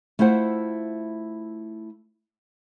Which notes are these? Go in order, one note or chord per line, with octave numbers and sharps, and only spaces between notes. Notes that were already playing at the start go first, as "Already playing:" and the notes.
A3 E4 F4 C5 F#5